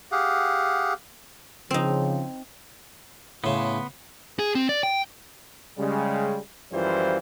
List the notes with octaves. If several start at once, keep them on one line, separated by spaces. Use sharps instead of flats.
G4 G#4 F5 F#5
C#3 F3 C4 D#4
A2 C#3 B3 C6
G#4
C4
D5
G5
C#3 G3 G#3
F#2 E3 F3 G3 F4 C5